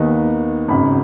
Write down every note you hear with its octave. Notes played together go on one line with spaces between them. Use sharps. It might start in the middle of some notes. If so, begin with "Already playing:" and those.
Already playing: D#2 D#3 B3 D#4
G#1 F#2 C#3 B5